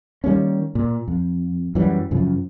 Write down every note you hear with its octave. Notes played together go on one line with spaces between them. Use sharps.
D#3 G3 A#3 C#4
A#2
F2
F#2 E3 F#3 G3
F#2 C#3 F3